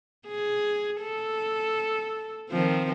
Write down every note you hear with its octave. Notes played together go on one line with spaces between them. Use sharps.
G#4
A4
D#3 F3 C4